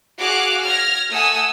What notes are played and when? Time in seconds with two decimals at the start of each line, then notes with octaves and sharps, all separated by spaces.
0.18 F#4 G#4 F5 D6 F#6
0.64 F6 G#6 A#6
1.10 A3 F#5 G#5 D#6 E6